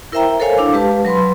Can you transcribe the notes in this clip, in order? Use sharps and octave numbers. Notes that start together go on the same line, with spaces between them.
E4 A#4 C5 E5 G5 A#5
A4 A#4 C5 C#5 F5 G#5
D4 E4 A4 F5 D6
G#3 G4 B4 F5 A5
F#3 B4 B5 C6